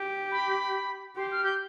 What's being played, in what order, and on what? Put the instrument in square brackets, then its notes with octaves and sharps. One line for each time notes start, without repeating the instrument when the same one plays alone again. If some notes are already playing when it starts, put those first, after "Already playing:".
Already playing: [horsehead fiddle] G4
[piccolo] B5
[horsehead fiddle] G4 [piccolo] C6
[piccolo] F6
G6